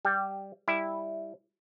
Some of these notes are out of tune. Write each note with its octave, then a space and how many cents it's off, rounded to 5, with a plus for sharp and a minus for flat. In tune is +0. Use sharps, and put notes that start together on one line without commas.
G3 +0 G4 -10
G3 +15 E4 +0